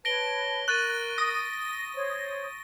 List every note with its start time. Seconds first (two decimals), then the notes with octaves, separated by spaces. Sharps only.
0.05 B4 C#5 A5 A#6 D7 G7
0.68 A#4 C#6 F#6 A6 D#7
1.18 D#6 A#6
1.95 C5 C#5